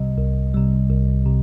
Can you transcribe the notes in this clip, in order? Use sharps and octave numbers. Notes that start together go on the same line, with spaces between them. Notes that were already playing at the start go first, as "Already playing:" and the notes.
Already playing: C2 C3 G3 D#5
C2
C3 G3
C2
C3